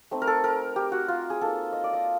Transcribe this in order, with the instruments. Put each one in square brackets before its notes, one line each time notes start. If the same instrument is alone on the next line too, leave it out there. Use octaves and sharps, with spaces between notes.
[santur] A3 C4 D#4
A#4
A4
A#4
G4
F#4
F4
G#4
A#3 D#4 A4
D#5
D5
D#5